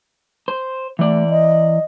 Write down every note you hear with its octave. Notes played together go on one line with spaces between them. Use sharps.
C5
E3 A3 D5
D#5